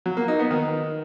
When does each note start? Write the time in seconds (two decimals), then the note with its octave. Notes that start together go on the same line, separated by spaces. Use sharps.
0.06 F#3
0.17 A#3
0.28 D#4
0.39 B3
0.51 D#3